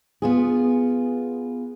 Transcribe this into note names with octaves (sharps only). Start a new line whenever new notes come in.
B3 F4 G#4